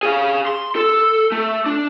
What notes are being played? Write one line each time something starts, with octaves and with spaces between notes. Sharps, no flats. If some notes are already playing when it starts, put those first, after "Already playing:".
G#4 F5
C6
A4
A3
D4